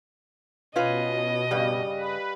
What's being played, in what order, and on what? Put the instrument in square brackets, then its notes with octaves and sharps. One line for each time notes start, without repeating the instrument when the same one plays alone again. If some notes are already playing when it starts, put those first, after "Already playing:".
[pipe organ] B2 [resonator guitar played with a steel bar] C#4 F4 B4 [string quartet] D#5
[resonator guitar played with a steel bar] G2 C#3 [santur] G3 F5 E6
[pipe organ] B4